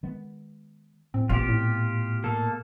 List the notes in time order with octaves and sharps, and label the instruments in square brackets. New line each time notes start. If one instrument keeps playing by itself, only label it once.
[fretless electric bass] D#3 G#3 B3
[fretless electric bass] A2 [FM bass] C4
[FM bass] A1 [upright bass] A#2 B3 [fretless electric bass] C4 [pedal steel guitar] F4 G4
[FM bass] A2
[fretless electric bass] B2 [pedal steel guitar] A#3 A4